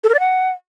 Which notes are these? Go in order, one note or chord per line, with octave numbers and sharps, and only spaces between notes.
A4
A#4
D5
F#5